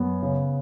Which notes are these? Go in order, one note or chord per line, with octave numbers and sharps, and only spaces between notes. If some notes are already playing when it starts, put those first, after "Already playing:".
Already playing: F#2 B3
C#3